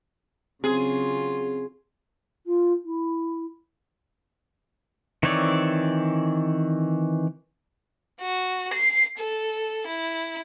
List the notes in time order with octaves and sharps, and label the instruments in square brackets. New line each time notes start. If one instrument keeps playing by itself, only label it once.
[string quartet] C#3 F#3 F4 [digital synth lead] C4 [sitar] G#4
[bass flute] F4
E4
[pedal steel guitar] D#3 E3 C4 C#5 D5
[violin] F#4
C7
A4
E4